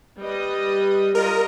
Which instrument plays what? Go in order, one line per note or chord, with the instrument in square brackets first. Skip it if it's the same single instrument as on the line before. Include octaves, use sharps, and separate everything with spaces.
[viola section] G3 B4 D#5
[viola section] G3 F4 D#5 [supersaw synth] A#4